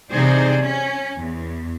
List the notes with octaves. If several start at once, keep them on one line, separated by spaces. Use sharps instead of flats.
C3 E3 D#4 G#4 C5 D5
C#4
E2